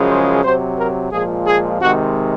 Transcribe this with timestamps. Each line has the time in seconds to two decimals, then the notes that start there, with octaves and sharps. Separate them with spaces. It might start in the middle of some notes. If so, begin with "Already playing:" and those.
Already playing: F#2 C#3 F3 G#3
0.08 C5
0.43 C3 F#3 C5
0.77 A#4
1.11 A#2 F3 G#3 G#4
1.46 G#4
1.80 C3 D#3 G#3 F#4